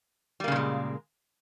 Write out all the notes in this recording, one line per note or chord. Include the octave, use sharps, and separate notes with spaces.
A#2 C#3 G3 G#3 A#3